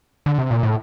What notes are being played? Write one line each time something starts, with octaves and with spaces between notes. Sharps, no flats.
D3
C3
A#2
A2